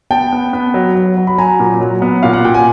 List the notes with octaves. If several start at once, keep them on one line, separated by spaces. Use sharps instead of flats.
B3 G5 A5
B3
B3
F#3
F#3
F#3
B5
F#3 G#5 A#5
A#2
F#3
B3
A#2 F5
F#5
A#2 G5
G#5